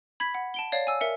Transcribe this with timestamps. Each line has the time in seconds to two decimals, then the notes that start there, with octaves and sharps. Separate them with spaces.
0.20 B5 G#6 B6
0.34 F#5
0.54 A5 D7 G7
0.72 C#5 D5 F5
0.87 G#5 E6
1.01 A#4 E5 C#7